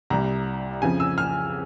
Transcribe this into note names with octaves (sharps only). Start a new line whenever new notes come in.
C2 C3 G3 A#5
F2 C#3 F3 G#5
E6
F6